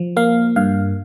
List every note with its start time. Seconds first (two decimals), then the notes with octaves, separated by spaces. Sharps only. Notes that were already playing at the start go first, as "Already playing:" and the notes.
Already playing: F3
0.17 A#3 F5
0.56 G2 F5